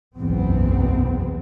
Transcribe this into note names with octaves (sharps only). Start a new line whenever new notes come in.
F#1 B1 E2 B2 B3 C4